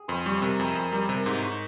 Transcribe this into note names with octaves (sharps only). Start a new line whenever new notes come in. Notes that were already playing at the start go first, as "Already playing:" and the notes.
Already playing: G#4
F2 C5
G3 C#5
C3 A#4
F2 G#4
F2
G3 A#4
C3
A#4
G#2 C5
G#2 C#5